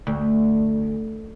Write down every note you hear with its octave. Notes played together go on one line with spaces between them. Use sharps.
D2